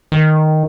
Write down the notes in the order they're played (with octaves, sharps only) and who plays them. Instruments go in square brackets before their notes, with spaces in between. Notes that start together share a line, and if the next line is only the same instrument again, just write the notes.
[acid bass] D#3